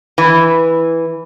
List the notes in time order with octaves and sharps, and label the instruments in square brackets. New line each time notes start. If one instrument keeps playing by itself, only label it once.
[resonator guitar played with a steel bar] E3